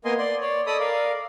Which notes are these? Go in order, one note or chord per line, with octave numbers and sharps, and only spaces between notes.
A#3 B3 A#4 D#5 G#5 C6
D5 C6
C#5 D5
A4 D5 D#5 B5 D#6
A#4 D5 F5